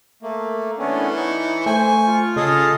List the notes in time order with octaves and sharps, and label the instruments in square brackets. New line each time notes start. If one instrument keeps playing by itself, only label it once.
[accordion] A3 A#3
[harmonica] E3 [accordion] A3 B3 C#4 [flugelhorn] D4
[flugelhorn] D#4 [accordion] C#6
[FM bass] A3 [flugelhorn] C5 [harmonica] G#5
[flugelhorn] F4
[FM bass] C#3 [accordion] G#4 A4 F5 [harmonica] D#5